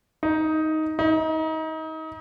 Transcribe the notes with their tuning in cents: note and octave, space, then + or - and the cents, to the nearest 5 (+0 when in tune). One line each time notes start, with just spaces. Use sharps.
D#4 +10
D#4 +30